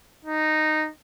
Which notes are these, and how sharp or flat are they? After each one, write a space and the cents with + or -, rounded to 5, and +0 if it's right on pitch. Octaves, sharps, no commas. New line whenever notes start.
D#4 -10